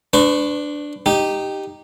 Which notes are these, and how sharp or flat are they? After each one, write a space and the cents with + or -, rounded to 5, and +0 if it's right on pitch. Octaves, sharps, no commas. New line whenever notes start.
D4 +0 B4 +35 C#6 -30
D#4 -10 G4 +0